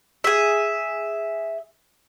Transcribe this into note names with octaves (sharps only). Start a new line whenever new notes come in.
G#4 E5